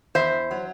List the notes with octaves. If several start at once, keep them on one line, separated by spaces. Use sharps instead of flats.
E2 C5 E5
F#3